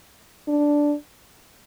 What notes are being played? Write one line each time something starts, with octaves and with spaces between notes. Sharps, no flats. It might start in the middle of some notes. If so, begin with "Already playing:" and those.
D4